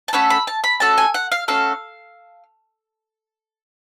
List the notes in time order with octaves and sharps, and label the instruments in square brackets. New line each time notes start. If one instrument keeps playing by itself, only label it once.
[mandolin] A5
A3 C#4 F#4 A4 B5
B5
A5
B5
A3 C#4 F#4 A4 A5
G#5
F#5
F5
A3 C#4 F#4 A4 F5